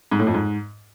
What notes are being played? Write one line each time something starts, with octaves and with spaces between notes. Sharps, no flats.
G#2
A2
F2
G#2